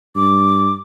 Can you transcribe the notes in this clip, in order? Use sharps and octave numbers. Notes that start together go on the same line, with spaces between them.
G2 D6